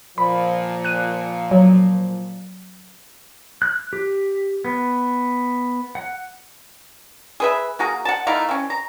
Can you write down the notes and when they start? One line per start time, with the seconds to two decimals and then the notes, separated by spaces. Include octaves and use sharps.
0.18 A#2 F3 B5
0.85 F#6 D#7
1.51 F#3
3.62 F#6
3.93 G4
4.65 B3
5.95 F#5
7.40 G#4 B4 E5
7.79 A#3 F#4 G#4 A#5
8.05 F#5 A5
8.27 A3 D#4 E4 F5
8.49 C4 C#4
8.70 A#5